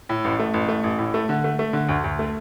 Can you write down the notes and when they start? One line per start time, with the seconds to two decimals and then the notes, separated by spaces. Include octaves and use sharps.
0.09 A2
0.24 A1
0.39 A3
0.54 A1
0.68 A3
0.83 A1
0.98 A2
1.14 A3
1.29 D3
1.44 A3
1.59 A3
1.73 D3
1.89 D2
2.04 D2
2.19 A3